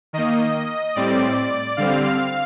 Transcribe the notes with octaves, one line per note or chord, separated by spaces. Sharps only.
D#3 A#3 D#5
A2 G3 C4 D5
D3 G3 C4 F5